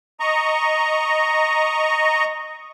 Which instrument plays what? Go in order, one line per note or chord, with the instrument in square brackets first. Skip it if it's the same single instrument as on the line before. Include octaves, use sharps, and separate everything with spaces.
[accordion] D#5 A#5 C#6